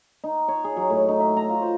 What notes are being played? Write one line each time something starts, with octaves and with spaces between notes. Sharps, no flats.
D#4
C#5
G#4
F#3
A2
D#4
E5
A#5
F4
C5